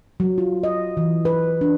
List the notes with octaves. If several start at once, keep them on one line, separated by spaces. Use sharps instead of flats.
F#3
F4
D#5
E3
B4
D4